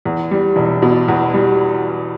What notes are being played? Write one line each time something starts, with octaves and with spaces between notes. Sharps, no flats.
E2
G3
E1
B2
E2
G3